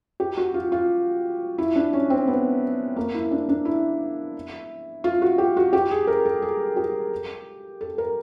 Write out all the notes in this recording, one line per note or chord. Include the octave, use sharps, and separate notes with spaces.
G4
F#4
F4
F4
E4
D4
C#4
C4
B3
A#3
E4
D4
D4
E4
F4
F#4
G4
F#4
G4
G#4
A#4
A4
G#4
G4
A4
A#4